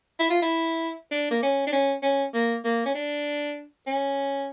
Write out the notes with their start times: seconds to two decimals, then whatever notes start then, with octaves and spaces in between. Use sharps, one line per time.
0.20 E4
0.30 F4
0.42 E4
1.11 D4
1.31 A#3
1.43 C#4
1.67 D4
1.73 C#4
2.03 C#4
2.34 A#3
2.65 A#3
2.86 C#4
2.95 D4
3.87 C#4